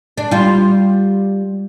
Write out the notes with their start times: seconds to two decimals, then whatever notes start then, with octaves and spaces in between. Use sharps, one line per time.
0.18 D4
0.31 G3 F4